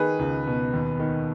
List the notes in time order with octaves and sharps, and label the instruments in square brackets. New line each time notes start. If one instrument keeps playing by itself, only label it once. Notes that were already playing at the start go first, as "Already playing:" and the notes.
Already playing: [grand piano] D#3 G#4 B4
C#2
B2
D#2
D#3